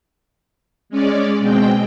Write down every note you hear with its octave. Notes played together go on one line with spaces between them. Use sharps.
G#3 C#4 D5
B2 G#3 C4 G5